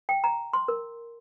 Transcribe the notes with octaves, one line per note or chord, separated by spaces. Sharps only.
G5
A#5
C6
A#4